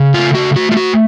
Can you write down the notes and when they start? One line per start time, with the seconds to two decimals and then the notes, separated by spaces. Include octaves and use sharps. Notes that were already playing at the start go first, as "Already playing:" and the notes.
Already playing: C#3
0.14 A3 F4
0.35 F#4
0.56 A3 F#4
0.72 F4
0.77 F#4